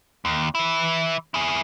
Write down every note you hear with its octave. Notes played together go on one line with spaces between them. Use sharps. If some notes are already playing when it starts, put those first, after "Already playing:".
D#2
E3 E4
E4 G#4